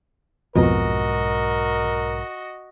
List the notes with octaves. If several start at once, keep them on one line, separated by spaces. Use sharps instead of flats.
B1 F2 G#2 B2 F#4 A#4 D#5 A#5